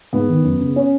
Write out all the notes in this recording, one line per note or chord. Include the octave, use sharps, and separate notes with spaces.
G#2 B3
D#3
F#2
C#3
C#4